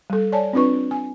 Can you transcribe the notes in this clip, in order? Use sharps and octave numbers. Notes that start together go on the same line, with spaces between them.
G3 A4
C#5 D5 G#5 A5
C4 D4 F4 B4 C#6
G#5